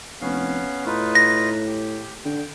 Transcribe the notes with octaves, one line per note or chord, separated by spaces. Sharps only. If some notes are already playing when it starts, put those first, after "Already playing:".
F1 B3 C#4 F5
A2 D#4 F4 B4
A#6
G4
D3 G5